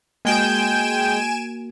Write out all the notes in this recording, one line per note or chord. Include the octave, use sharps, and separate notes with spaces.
G#3 A#3 F#4 G5 G#5 G6 D7 E7